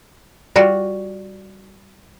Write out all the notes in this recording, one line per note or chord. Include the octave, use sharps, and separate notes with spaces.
G3 F4 F#4